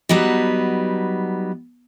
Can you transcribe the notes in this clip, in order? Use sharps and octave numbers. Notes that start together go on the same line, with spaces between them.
F#3 G3 B3 D#4